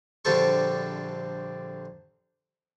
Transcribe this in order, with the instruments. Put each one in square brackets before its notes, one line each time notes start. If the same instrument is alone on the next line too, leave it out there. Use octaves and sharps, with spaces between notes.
[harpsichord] A#1 D3 G3 C4 A4 C#6